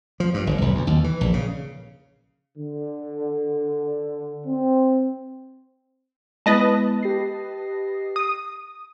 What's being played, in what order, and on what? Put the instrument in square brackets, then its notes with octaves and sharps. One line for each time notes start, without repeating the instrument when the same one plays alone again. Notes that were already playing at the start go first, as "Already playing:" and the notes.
[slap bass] F3
G2
G1
B1
D2
D#2
E3
A#1
C#3
[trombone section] D3
C4
[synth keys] G#3 B3 E4 [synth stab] B4 D#5 A5
[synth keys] G4 A#6 C7
[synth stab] D#6